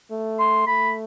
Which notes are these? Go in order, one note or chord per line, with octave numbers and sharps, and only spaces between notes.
A3
C6
A3 B5